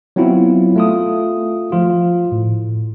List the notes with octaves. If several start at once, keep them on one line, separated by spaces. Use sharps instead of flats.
F#3 B3 C4 E4 F4
A3 F4 D#6
F3 F4
A2